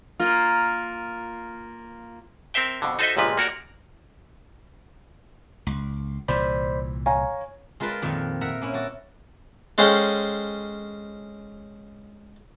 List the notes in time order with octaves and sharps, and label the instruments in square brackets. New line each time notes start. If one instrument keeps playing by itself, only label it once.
[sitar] A#3 F4
[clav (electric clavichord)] C4 A#4 C5 E5 G5
F2 B2 D3
D#4 F#4 A4 C5 D#5 E5
G1 C#2 A#2 F3 B4
A#3 F#4 A#4 D5
[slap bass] C#2
[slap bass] C2 A#2 E3 [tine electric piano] C5 D5 B5
[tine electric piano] C#5 [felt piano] F5 G#5 A#5
[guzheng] G#3 F4 A#4 B4 A5 C6
F2 A#2 D#3
A#4 E5 F#5 A#5
A#3 C#4 E4
A#3 F#4 A5
[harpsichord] G#3 C#4 A4 C5 F5 G5